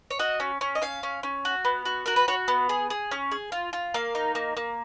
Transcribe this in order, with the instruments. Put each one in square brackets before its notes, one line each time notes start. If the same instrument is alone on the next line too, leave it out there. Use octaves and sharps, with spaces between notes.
[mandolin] C#5
F#4 D#5
C#4
C#4
D#5
C#4 F5
C#4
C#4
F#4
B3
F#4
F#4 A#4
B4
F#4 C#5
B3
G#4
G#4
C#4
G#4
F4
F4
A#3 F5
D#4
A#3
A#3